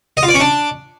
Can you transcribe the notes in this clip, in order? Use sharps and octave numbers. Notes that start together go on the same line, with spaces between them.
D#5
F4
D5
C#4
D4